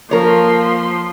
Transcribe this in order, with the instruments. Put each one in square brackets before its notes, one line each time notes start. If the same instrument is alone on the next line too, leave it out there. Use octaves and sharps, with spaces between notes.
[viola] F3 C6 [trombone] A#3 [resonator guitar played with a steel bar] A#4 C#5